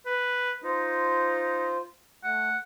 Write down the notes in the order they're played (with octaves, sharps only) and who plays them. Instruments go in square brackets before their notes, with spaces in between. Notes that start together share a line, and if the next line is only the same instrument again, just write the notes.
[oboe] B4
[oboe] D#4 [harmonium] F4 C5
[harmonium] A3 [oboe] F#5